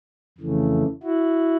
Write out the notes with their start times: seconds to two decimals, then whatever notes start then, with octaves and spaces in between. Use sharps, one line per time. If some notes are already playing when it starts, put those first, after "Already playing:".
0.38 F2 C#3 E3 A3
1.03 E4 F#4